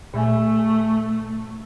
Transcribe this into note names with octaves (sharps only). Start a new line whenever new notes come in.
A#2 A3 E5 G#5